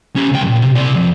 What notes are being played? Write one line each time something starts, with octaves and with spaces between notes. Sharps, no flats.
C#4 G4
C#2 G5
F#2 A#2
C3
C3 D5
F2